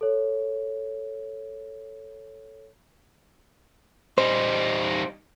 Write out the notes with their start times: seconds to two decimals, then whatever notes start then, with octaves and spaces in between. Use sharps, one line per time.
0.01 A4 C#5
4.18 G3 D#4 C5